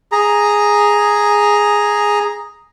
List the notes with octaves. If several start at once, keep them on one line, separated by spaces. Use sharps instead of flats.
G#4 A#5